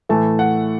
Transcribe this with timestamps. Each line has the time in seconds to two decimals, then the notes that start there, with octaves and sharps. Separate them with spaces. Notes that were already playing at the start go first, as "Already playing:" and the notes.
0.09 A2 E3 A3 A5
0.39 F#5